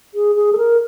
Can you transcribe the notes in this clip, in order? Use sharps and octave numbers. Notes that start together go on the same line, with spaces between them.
G#4
G#4
A4
A#4